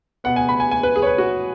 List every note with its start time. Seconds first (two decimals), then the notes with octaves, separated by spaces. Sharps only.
0.24 B2 B3 F#5
0.36 G#5
0.49 B5
0.60 G#5
0.71 G#5
0.83 B4
0.96 G#4
1.02 C#5
1.06 B4
1.18 F#4